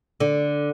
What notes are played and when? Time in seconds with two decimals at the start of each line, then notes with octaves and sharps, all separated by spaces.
0.20 D3